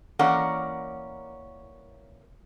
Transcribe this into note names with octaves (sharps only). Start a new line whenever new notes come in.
E3 A#3 C#4 A#4 D5 F#5